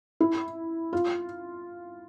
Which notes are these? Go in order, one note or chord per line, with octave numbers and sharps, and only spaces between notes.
E4
F4